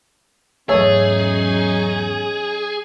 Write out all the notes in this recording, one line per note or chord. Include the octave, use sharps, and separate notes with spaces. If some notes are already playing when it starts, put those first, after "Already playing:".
E2 G#2 F#3 A3 C#4 D#4 G#4 C#5